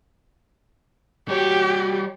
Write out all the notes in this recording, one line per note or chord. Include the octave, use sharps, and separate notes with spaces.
G3 F#4 G4 C#5